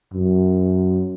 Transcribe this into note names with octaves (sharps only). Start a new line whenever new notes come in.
F#2